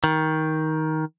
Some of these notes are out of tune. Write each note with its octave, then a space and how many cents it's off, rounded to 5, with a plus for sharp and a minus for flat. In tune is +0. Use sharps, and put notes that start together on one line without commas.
D#3 +15